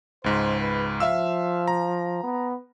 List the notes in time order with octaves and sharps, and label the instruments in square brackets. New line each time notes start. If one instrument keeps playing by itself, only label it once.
[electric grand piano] C#2 G#2 [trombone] C5
[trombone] B4
[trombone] F3 [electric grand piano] E5 F5 E6
[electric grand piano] A#5
[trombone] B3